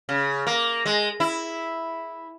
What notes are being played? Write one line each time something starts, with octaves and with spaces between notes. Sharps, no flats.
C#3
A#3
G#3
E4